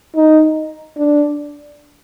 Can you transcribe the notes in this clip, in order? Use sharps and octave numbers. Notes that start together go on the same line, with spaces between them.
D#4
D4